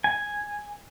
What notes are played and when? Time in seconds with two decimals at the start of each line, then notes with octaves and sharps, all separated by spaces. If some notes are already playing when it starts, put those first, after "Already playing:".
0.04 G#5